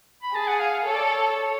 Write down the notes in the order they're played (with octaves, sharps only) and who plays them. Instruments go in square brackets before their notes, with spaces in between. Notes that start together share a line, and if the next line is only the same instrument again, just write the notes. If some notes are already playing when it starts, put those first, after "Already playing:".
[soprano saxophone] B5
[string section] G#4 [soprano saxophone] A5
[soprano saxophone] F#5
F5
F5
[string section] A4 [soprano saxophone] C#5
[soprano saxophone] D5
C#5